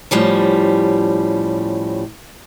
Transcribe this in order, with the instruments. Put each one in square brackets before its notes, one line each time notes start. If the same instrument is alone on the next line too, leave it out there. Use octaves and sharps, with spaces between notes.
[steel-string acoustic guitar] A2 F3 G3 C#4